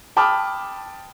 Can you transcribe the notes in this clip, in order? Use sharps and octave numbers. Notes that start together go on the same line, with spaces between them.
G5 A5 B5 D6 D#6 F6